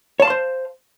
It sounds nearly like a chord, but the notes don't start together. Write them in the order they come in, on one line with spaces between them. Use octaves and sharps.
C#5 A5 F5 C6 C5